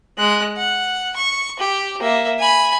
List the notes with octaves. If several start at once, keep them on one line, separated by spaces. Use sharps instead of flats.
G#3 F#6
F#5
C#6
G4
A#3 E5
G#5 B5